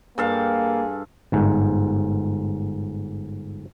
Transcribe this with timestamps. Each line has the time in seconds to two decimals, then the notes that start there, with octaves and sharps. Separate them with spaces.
0.18 G2 A#3 G#4 A4 F5
1.32 G1 G#2